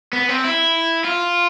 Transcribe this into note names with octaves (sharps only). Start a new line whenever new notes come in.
B3
C4
E4
F4